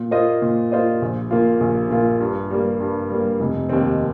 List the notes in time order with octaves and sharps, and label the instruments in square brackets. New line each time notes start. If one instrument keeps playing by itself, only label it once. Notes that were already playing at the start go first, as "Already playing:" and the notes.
Already playing: [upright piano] A#2
A#3 F4 C5 D#5
A#2
A#3 F4 C5 D#5
A#1
A#2 A#3 F4
A#1
A#2 A#3 F4
G2
G3 A#3
G2
G3
A#3
F1
D#2 D#3 C4